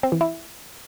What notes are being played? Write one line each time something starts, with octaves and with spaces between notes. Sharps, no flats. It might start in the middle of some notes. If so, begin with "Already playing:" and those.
C4
E3
E4